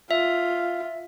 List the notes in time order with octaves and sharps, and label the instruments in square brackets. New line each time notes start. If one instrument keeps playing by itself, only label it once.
[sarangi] F4 [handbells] E5